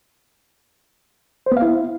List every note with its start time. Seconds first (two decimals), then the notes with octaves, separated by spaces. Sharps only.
1.46 C5
1.52 B3
1.57 F5
1.62 E4